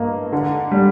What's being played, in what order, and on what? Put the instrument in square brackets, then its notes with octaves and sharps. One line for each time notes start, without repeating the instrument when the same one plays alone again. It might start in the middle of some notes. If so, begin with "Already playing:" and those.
Already playing: [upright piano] G2 A#3 D#5
D3
G3